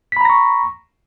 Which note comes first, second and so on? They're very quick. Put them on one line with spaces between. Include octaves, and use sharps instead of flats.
B6 B5 A#5 A#6 C#6